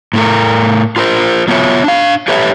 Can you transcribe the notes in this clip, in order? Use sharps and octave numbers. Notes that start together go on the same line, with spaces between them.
A2 A3 A#4
F4 A#4 C5
F#3 B3 F4 C#5 E5
D4 F5
G4 A4 B4 C#5 E5